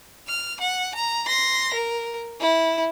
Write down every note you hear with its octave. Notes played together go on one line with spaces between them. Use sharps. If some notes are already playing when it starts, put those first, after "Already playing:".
F6
F#5
A#5
C6 A#6
A#4
E4